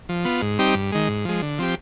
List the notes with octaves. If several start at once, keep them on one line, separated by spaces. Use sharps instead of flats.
F3
B3 F4
G#2
G3 C4 D#4 G4
G2
D#3 G#3
G#2
F3 G#3
D3
F3 C4 G4